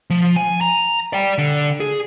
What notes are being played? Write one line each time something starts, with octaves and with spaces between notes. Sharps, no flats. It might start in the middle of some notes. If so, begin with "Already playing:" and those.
F3
G#5
A#5
D5 G5
D3
G#4